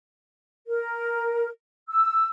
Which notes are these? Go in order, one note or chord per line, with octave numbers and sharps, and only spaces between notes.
A#4
E6